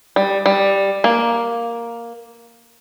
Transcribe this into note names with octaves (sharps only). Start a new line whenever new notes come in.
G3
G3
A#3